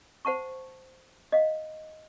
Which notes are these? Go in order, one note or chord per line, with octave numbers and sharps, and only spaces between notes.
C5 F#5 A5 C#6
D#5 F5